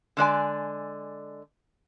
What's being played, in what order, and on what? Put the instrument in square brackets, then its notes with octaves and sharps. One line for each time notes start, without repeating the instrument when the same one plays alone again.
[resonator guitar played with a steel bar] D3 G#3 D5 G#5